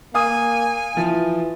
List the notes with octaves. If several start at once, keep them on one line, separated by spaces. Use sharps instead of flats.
A#3 F5 G#5 D#6
E3 F3